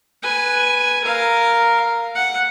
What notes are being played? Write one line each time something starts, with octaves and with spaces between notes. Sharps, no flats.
B4 G#5
A#4 F5
F#5